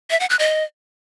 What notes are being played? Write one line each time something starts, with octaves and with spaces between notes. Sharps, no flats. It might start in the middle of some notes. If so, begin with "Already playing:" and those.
E5
F#5
F#6
D#5